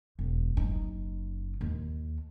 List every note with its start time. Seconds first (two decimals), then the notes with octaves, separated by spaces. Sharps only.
0.19 E1
0.57 F#1 D#4
1.61 D#2